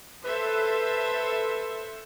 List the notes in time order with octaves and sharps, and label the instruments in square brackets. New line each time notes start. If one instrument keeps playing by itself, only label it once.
[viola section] A4 C5 E5 [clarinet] B4